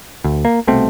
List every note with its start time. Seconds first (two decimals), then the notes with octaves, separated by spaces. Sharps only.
0.24 D2
0.45 A#3
0.67 C2 B2 A3 C4